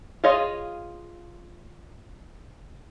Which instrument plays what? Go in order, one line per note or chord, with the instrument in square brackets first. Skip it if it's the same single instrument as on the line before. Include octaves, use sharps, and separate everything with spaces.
[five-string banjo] F4 G#4 C#5 D#5 F5